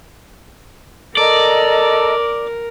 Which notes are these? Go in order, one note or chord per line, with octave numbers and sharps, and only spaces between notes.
A4 A#4 D5 D#5 A#5